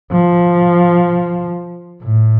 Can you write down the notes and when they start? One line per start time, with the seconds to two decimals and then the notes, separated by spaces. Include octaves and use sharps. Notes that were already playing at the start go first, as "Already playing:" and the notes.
0.12 F3
2.02 A2